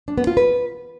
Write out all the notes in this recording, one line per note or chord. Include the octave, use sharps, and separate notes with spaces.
D4
B3
F4
B4